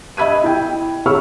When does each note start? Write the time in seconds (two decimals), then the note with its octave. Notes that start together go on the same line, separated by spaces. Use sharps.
0.17 D#5 E5 B5 G#6 D#7
0.44 E4 G5
1.06 G#4 C#5 B5 C#6 E6 F6